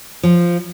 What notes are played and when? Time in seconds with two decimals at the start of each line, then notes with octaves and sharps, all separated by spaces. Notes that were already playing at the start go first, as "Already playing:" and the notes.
0.23 F3